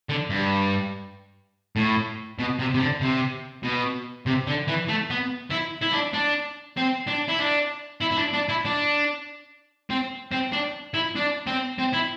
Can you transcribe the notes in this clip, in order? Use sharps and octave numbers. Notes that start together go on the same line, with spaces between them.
D3
G2
A2
B2
C3
C3
D3
C3
B2
C3
D3
E3
A3
B3
E4
E4
D4
D4
C4
D4
E4
D4
E4
E4
D4
D4
E4
D4
C4
C4
D4
E4
D4
C4
C4
E4